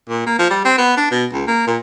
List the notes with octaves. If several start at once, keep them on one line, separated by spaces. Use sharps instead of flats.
A#2
A#3
F3
G3
C4
B3
D4
B2
C#2
A#3
A#2